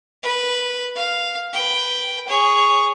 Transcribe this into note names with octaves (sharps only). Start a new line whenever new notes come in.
B4
F5
B4 G5
G#4 C#5